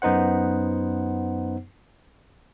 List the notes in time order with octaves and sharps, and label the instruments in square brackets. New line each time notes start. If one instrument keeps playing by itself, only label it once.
[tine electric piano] F#2 B3 D#4 C5 F#5